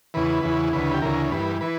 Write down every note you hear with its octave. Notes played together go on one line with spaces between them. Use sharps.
E2 C#3 E3 B4
E2 C#3 E3
D2 C#3 E3 B4
G4
D2 C#3 E3 A#4
G2 E3 B4
E3 B4